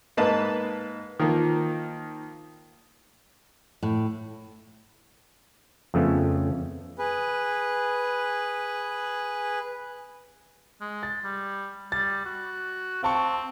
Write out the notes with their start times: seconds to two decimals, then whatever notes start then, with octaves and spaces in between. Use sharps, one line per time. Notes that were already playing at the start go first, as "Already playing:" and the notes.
0.17 G#2 A#3 B4 D#5 A5
1.20 D#3 F3 A#3
3.83 A2
5.94 F2 C#3 F3 A3 B3 C#4
6.98 G#4 B4
10.81 G#3
11.03 A6
11.24 G3
11.92 G3 A6
12.25 F#4
13.03 C4 F5 A5 C#6